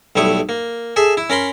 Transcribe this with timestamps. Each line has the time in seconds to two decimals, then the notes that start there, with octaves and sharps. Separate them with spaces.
0.16 B1 G3 A3 E4 C#6 D#6
0.49 A#3
0.96 G#4 A4 E5
1.17 E4
1.30 C#4 A#4 B5 C6